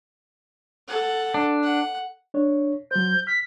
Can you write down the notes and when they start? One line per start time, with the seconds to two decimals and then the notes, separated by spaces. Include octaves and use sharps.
0.88 A4 F#5
1.34 D4
1.63 F#5
2.34 D4 C#5
2.91 F#3 C5 G6
3.27 F6 B6